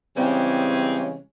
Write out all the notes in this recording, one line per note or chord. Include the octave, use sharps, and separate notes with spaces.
C#3 E3 G3 G#3 C4 C#4